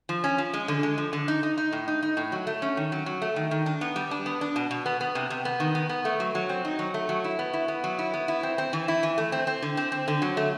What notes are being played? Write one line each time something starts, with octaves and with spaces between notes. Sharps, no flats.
F3
C#4
F3
G#3
D3
G#3
F3
D3
D#4
D#4
D#4
A2
D#4
D#4
A2
F#3
A3
C#4
D#3
F#3
F#3
A3
D#3
D#3
D4
B3
G3
D4
B3
D4
B2
B2
B3
B3
C3
C3
B3
D#3
B3
B3
A3
F#3
F#3
C4
D#4
F#3
A3
F#3
E4
B3
E4
B3
F#3
E4
B3
E4
C4
C4
E3
E4
E3
A3
C4
C4
D3
C4
C4
D3
F#3
A3